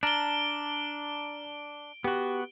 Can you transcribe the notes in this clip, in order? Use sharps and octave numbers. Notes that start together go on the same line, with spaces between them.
D4 A5 A#5 F6 D7 G7
B3 F#4 G4